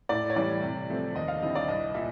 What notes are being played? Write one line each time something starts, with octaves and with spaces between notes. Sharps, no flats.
A2 D5
C#5
E3 G3 D5
C3
F3 A3 C4
D#2 D#5
F5
D3 G3 C4 E4 D#5
D5
C2 D#5
A#2 E5